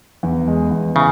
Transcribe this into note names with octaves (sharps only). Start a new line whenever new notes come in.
E2
G#3
E2
C#3 E4